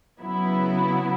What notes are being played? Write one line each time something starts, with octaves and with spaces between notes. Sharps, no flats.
C#3 F#3 B3 E4